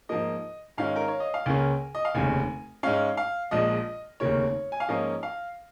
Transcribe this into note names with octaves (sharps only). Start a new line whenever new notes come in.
G#2 F3 A#3 D#5
G#2 D#3 G#3 C#4 F5
A#4
C#5
D#5
F5
C#2 C#3 A#3 C#4 G#5
D#5
F5
F1 D#2 C#3 G#5
G#2 G#3 C#4 F5
F5
A#1 A#2 F3 G#3 D#5
F1 D#2 C#3 A#3 C#4 C#5
G#5
F5
G#2 F3 A#3 C#4 D#5
F5